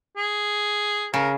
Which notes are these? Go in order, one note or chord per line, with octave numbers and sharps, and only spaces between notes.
G#4
C#3 A#4